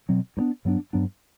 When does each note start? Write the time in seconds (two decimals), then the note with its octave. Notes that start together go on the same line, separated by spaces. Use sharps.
0.09 B2 F#3 C4
0.37 G2 F#3 B3 D4
0.65 G2 F#3 B3 D4
0.93 G2 F#3 B3 D4